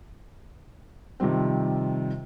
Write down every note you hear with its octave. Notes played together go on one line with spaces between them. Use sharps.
C3 D#3 F3 G3 C4